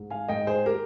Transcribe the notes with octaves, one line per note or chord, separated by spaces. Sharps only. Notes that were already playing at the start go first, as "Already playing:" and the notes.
Already playing: G#2
F5 G#5
G#2 D#5 G5
G#4 C5
G4 A#4